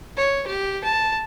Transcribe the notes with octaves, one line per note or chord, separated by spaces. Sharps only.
C#5
G4
A5